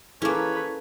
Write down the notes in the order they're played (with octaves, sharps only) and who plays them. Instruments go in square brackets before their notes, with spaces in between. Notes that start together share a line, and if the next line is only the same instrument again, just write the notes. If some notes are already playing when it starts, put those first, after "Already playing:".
[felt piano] E3 G#4 [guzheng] A#3 C#4 [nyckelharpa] A4 B4 [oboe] C#5